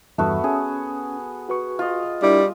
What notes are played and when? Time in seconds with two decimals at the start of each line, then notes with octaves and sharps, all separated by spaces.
0.18 E2 G2 A3 B3 F#4
0.44 C#4 G#4
1.49 F#4 B4 C#6
1.79 F4 D#5
2.23 G3 D4 E4 A#4